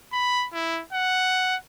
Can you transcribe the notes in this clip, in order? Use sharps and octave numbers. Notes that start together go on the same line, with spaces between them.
B5
E4
F#5